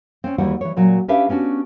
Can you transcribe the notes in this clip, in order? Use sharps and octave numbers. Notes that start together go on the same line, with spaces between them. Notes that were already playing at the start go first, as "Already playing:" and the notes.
C4 C#4
D#2 E3 G3 F#4 F#5
E3 C#5
A#2 F#3 F#4
C#4 D4 G4 B4 E5 F5
B3 C#4 D4 F#4